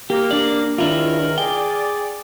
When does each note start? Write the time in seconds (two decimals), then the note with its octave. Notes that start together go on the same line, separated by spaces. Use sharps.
0.10 A#3 G4
0.31 D4 D5
0.78 C#2 D#3 D4 E4 F4 A#4
1.38 G#4 D5 G5